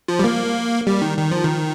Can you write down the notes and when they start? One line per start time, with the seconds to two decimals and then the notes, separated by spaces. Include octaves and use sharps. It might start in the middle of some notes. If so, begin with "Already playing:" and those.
0.08 F3
0.19 G3
0.24 A#3
0.87 G3
1.02 D#3
1.18 D#3
1.31 F3
1.44 D#3